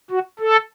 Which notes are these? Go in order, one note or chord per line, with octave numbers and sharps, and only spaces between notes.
F#4
A4